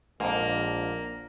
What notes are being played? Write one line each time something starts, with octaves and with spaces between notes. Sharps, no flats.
A#1 F2 G#2 A#3